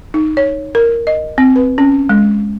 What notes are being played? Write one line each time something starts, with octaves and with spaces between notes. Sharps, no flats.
D#4
C#5
A#4
D#5
C4
B4
C#4
G#3